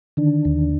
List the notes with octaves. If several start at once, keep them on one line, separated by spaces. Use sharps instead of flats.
D3 D#3 D4
D#2